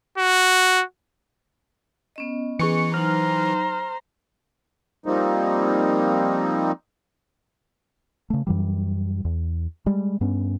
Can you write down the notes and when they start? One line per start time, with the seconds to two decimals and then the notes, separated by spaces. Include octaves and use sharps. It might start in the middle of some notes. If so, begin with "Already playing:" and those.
0.18 F#4
2.16 B3 C#4 D#5
2.59 E3 G#4 C#6 C#7
2.94 F#3 D#4 C5 A#5 F6
5.06 F3 G3 A#3 C4 D#4
8.30 C#3 A3
8.47 F#2 E3 G3
9.25 E2
9.86 G3 G#3
10.21 G2 B3 C#4